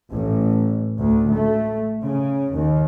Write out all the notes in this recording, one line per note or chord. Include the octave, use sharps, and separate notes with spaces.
A1
D2
A3
C#3
D#2